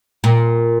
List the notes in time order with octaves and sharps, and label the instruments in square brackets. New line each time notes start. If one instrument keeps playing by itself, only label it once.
[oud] A#2